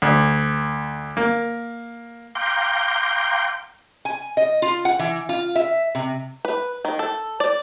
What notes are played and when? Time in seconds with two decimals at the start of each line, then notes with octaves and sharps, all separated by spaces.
0.02 D2
1.17 A#3
2.35 F5 G5 A#5 C6 D6 G6
4.05 G#5
4.37 D#5
4.62 F4
4.85 F#5
4.99 E3
5.29 F4
5.55 E5
5.95 C3
6.45 B4
6.85 D#3
6.99 A4
7.40 D5